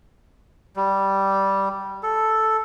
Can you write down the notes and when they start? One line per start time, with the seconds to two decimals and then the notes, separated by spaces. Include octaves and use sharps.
0.76 G3
2.03 A4